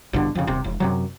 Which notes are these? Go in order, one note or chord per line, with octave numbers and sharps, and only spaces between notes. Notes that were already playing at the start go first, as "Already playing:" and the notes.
A1 G2 B2 D3
F2 C#3
D#1 C3
E1
F#2 C3 F#3